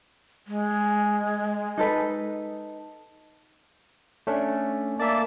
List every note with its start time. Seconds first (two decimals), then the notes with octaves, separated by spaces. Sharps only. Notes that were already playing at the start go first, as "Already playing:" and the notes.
0.47 G#3
1.78 D#4 A4 B4
4.27 A3 C#4 D4
5.00 A#3 D5 E5 A5